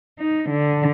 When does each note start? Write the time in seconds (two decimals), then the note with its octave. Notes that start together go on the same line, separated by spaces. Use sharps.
0.20 D#4
0.49 D3